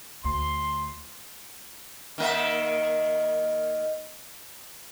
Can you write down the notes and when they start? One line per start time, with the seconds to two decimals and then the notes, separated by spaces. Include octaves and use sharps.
0.24 D2 C6
2.18 D#3 A#3 E5